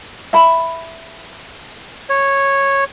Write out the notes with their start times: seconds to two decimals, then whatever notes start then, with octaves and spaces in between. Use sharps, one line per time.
0.33 E5 B5
2.10 C#5